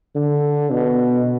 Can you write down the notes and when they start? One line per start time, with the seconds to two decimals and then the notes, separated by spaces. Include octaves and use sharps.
0.15 D3
0.70 B2